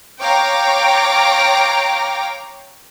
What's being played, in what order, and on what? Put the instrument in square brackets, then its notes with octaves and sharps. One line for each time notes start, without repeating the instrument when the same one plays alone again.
[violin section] C#5 F5 G5 A#5 D6